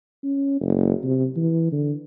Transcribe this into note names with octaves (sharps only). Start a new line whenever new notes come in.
C#4
F#1
C3
E3
D3